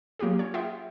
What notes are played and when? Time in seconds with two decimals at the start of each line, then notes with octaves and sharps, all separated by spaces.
0.19 F#3 A#3 F4 G4 G#4
0.39 C#4 C#5
0.54 F4 G#4 E5 F#5 G5